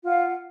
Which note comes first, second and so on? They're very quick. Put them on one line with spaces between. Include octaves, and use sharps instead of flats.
F4 F#5 F5